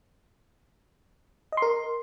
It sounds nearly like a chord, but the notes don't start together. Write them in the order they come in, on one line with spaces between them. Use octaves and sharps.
D#5 C6 A#4